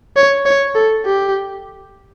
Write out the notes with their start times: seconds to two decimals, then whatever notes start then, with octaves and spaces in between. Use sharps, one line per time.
0.17 C#5
0.46 C#5
0.75 A4
1.05 G4